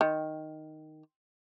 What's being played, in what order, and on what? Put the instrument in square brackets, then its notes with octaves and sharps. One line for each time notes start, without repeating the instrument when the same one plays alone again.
[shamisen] D#3